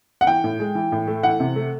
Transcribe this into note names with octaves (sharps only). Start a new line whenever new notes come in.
F#5
E3 G5
A2
G#3
E3
A2
A3
E3 F#5
C3
A3